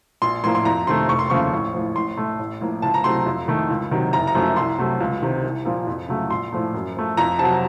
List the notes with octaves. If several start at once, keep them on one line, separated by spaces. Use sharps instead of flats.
A#1 C6
A2 F3 A#3 C6
C6
F2 A#5
C3 D#3 A3 C6
F1 C#6
C6
D#2 C#3 F3 A3 C#6
A1
A2 F3
A1 C6
A2 A3
A1
A2 F3 A#3
C#2 A5
A#5
C3 F#3 A3 C6
F2
D#3 A3
C#2
C3 D#3 F#3
F#1 A#5
A#5
F#2 F3 A3
C2 C6
C3 F#3 A3
C#2
C3 D#3
C2
A#2 F3 A#3
F2
C#3 F#3 A3
A#1 C6
A2 F3 A3
F#2
F3 A3
F2 A#5
C3 F#3 A5